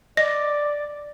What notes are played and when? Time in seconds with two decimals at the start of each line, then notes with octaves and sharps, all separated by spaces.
0.17 D5 D#5